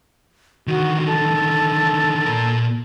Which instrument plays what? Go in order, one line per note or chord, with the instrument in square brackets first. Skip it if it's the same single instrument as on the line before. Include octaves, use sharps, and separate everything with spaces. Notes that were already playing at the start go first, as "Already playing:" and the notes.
[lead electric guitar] D3 D#3 [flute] F#4
[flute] A4
[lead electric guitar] A#2 A#4